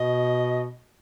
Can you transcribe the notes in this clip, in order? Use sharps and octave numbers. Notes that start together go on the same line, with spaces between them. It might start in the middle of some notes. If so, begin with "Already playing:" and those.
Already playing: B2 D#5